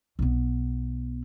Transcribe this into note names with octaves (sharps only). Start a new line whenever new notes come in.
B1 B3